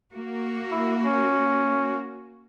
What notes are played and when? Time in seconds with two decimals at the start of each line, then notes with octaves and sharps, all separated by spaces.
0.12 A#3 F#4
0.72 E4
1.05 C#4